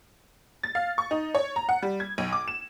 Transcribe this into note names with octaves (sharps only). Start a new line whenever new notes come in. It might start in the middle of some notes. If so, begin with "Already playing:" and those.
A6
F5
C#6
D#4
C#5
A#5
F#5
G3
G#6
B1
D6
E7